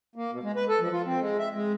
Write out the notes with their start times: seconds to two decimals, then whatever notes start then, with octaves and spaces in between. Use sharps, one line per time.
0.16 A#3
0.32 B2
0.43 G#3
0.56 B4
0.69 A4
0.80 F3
0.93 F4
1.06 C4
1.20 G#3
1.39 E5
1.55 G#3